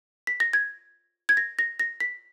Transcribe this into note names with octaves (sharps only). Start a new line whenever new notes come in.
B6
A#6
G#6
G#6
A#6
A#6
A#6
B6